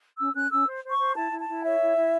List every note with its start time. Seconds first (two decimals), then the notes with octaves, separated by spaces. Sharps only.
0.17 C#4 E6
0.34 C#4 F#6
0.50 C#4 E6
0.67 C5
0.83 C5
0.91 C#6
0.98 C5
1.15 E4 A5
1.31 E4
1.39 A5
1.47 E4
1.63 C#5 E5
1.80 E4
1.96 E4